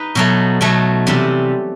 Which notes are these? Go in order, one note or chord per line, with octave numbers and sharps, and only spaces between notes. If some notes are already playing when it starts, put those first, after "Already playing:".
Already playing: D#4 B4
B2 F#3 A3
B2 F#3 A3
C3 E3 G3